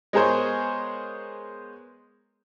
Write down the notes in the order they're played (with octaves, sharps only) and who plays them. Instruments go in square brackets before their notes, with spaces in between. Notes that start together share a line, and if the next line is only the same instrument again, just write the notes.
[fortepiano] G#3 B3 G#4 A#4 C5 C#5